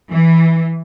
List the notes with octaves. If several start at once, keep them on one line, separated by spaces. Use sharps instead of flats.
E3